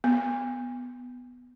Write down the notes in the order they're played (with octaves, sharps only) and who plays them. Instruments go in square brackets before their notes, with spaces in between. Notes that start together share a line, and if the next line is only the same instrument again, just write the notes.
[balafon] B3